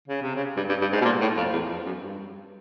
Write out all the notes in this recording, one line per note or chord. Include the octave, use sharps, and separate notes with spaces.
C#3
C3
C#3
G2
G2
G2
G#2
B2
A#2
A2
F2
E2
F2
F#2
G2